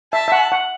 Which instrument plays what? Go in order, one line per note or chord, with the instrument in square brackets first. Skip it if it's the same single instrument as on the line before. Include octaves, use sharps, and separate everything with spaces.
[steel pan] E5 [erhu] A5
[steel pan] E5
F#5
F#5